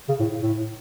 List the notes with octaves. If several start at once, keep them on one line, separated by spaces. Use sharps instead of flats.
C#3
A2
A2